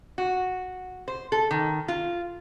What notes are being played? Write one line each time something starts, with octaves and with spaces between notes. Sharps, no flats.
F#4
C5
A4
D#3
F4